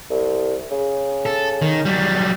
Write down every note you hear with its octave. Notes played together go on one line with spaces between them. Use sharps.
C2
C#3
A4
D#3
F#3 G3